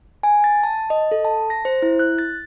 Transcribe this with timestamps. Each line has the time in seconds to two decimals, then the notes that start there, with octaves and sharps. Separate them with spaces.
0.23 G#5
0.44 A6
0.63 A5
0.90 D#5
1.11 A4
1.25 A5
1.50 A#6
1.65 C5
1.82 E4
1.99 F#6
2.18 A6